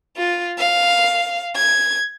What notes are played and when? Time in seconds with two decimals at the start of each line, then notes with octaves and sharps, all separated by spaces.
0.16 F4
0.58 F5
1.55 G#6